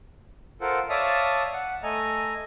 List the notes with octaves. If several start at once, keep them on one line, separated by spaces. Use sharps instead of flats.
F4 A4 A#4 C5 F5 F#5
C#5 D5 E5 F5 A5 D#6
F#5
A3 A4 D#5 G#5 A#5